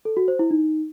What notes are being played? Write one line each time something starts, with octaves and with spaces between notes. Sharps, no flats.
A4
F#4
C5
E4
D#4